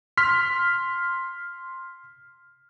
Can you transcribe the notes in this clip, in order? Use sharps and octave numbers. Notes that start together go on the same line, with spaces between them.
C6 F6 B6